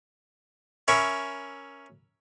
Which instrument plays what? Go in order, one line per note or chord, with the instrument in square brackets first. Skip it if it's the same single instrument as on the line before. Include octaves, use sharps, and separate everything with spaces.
[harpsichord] C#4 A#4 E5 B5 C#6